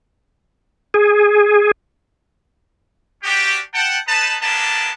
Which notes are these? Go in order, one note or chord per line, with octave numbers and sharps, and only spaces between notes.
G#4
C#4 D4 F#4 G4
F#5 G5 A5
D#4 B4 A5
G3 G#3 A#3 B3 D4 A5